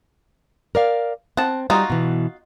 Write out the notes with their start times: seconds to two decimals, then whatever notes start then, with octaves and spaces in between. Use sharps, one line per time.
0.75 A#4 D5 F5
1.37 C4 F#5 A5
1.70 G3 D#4 F4 F#4
1.90 B2 E3